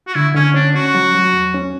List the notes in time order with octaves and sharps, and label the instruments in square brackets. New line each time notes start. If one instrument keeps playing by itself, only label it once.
[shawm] F#4
[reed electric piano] D3 [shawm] E4
[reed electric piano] D3 [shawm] C#4
[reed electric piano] C#4 [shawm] D4
[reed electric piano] C#4 [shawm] F#4
[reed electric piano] F#3
F#3
E2
C#4